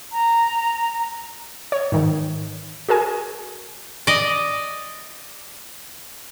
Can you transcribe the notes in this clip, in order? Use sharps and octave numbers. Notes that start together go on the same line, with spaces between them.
A#5
C#5
G#2 D#3 E3
F#4 G#4 A#4 G#5
D5 D#5